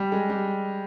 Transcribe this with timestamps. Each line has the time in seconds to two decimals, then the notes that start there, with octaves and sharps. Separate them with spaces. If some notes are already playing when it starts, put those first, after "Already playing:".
Already playing: G3
0.12 G#3
0.30 G3